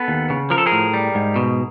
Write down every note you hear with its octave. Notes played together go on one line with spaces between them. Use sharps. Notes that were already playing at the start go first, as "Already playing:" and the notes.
Already playing: B3 A4 B4
D#2
C#3
F3 A#4
A4
G#4 A#4
A2
G3
G#2
B2